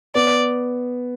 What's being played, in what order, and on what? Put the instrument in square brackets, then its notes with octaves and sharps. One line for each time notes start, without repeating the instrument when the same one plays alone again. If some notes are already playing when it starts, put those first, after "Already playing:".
[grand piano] B3 [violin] D5